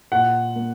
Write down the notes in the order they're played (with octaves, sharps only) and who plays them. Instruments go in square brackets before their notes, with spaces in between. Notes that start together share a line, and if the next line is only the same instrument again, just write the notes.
[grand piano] A#2 [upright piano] F#5
[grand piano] A#3